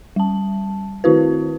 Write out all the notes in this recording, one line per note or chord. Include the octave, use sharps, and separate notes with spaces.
G3 A5
D#3 C4 E4 F#4 B4